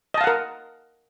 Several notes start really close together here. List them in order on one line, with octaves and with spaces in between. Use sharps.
D#5 A5 F5 F#5 A#4